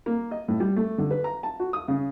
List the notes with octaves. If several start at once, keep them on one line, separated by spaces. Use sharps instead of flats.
A#3
D#5
A2
G3
A3
D3
B4
A#5
A5
F#4
D#6
C#3